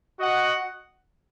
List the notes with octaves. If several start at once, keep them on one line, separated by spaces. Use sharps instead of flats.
F#4 D#5 F#5